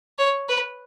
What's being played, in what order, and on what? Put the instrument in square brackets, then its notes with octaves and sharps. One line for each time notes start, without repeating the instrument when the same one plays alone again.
[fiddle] C#5
B4